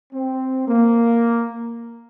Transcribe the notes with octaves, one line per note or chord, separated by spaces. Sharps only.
C4
A#3